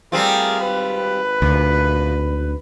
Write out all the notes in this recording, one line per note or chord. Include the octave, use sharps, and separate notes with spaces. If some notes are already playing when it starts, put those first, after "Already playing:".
G3 A3 C4 F4 G#4 A#4
G#1 B4
D2 A#2